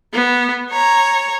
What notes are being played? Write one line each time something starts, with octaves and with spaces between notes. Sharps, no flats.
B3
C#5 A#5